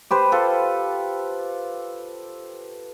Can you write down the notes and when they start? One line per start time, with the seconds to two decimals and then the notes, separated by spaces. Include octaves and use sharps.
0.11 G4 B4 C5
0.32 F4 A4 B4